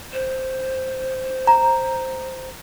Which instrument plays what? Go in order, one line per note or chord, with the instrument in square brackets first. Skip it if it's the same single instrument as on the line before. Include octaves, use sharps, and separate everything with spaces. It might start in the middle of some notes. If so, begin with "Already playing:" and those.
[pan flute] C5
[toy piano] A#5